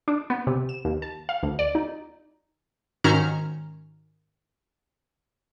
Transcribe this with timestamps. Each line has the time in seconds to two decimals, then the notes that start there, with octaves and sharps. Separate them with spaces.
0.08 D4
0.30 B3
0.47 C3
0.69 E7
0.85 D#2
1.02 A5
1.29 F5
1.43 D2
1.59 D5
1.75 D#4
3.04 G#2 D#3 C#4 F#4 A#5 F6